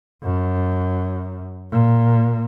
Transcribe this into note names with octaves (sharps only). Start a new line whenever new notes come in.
F#2
A#2